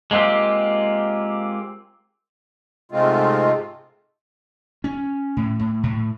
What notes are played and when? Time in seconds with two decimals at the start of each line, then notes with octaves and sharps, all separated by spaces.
0.11 G#3 A#3 C4 F4 G4
2.92 G#2 C3 G#3 A3 C4 F4
4.84 C#4
5.37 A2
5.59 A2
5.83 A2